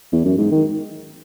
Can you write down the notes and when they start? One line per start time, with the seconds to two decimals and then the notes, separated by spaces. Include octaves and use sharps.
0.13 E2
0.25 F#2
0.38 G#2
0.51 D#3